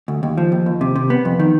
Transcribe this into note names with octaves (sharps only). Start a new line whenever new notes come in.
D2
D#2
F3
D#2
D#2
C3
C3
B3
F2
D#3